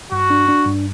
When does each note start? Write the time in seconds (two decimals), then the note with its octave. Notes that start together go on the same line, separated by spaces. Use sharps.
0.12 G2 F#4
0.30 D4
0.48 D4
0.66 G2